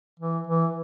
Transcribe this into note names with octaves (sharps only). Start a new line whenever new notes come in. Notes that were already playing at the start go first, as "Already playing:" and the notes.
E3
E3